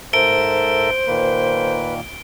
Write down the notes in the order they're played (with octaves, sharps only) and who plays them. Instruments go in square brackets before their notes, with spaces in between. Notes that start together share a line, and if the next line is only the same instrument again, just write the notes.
[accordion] G#2 [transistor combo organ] A4 A#4 E5 [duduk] C5 [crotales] D7 G7
[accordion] A#2 D#3 A#3 [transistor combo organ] B4